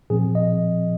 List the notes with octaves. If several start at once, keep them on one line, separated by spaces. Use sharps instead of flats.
A#2 F3 C4 G#4
D#5